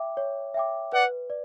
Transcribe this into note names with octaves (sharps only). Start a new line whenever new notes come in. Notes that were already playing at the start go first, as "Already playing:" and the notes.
Already playing: E5 G5 D6
C#5
E5 G5 D6
B4 D5 F#5
D5